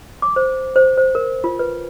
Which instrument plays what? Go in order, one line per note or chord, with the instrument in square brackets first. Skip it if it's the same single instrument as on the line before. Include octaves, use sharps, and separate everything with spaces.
[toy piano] D6
C5
C5
C5
A#4
F4
B4